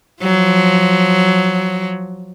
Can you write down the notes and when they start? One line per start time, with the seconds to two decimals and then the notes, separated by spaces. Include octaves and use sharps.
0.22 F3 F#3